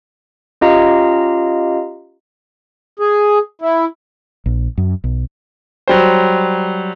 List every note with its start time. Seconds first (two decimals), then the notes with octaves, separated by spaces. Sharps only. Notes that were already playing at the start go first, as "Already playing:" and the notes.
0.61 C#4 F4 G4 D#5 F5 A#5
2.99 G#4
3.62 E4
4.46 A#1
4.78 F#2
5.04 B1
5.88 F#3 G3 C5